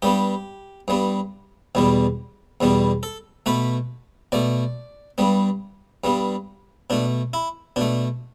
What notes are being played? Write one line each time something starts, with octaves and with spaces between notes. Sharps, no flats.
G2 G3 B3 G4
G2 G3 B3
E2 B2 G3 B3
E2 B2 G3 B3
A4
B2 A3 B4
B2 A3 D5
G2 G3 B3
G2 G3 B3
B2 A3 D4
E4
B2 A3 D4